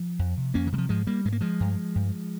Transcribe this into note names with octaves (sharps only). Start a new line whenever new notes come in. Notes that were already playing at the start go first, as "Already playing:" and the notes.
Already playing: F3
F2
C3
F2 A#3 C#4
D#3
C3 G3
F3
G#2 F3 G#3
G3 A#3
G#2 G#3
A#3
F3 G#3
G2
G2